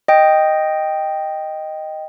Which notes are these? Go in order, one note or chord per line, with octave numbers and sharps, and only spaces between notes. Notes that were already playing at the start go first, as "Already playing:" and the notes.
D#5 G5